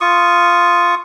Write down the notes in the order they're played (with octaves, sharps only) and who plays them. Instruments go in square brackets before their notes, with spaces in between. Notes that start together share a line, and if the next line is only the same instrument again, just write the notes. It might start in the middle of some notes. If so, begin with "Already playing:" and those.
[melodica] F4 C#6 D#6